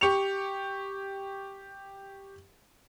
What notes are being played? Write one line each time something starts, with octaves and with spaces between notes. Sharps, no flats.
G4 C#6 C#7 F7